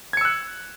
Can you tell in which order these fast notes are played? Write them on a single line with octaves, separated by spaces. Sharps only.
G#6 C#7 E6 F#6